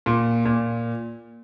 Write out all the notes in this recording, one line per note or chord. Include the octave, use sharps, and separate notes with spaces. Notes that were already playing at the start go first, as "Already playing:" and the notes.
A#2
A#2